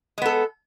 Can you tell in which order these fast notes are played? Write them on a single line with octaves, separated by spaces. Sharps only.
G#3 B3 A4